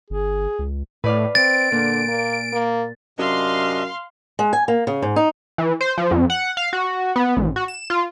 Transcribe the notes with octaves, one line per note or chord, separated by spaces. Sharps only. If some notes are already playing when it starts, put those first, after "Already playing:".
G1 G#4
C#2
A2 B4 D5 F5
C4 A6 D7
A#2 D3
A#3
A#3
F#2 C3 D4 D#5 F5 C6
G#3
G#5
A#3
C#3
G#2
D#4
E3
C5
F3
F2
F#5
F5
F#4
B3
A1
F#4
E7
F4